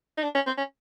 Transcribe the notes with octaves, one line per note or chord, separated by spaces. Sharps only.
D#4
D4
C#4
C4
C#4